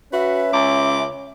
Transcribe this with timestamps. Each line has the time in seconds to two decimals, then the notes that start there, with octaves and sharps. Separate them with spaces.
0.13 C#4 F#4 B4 E5
0.53 C#2 D6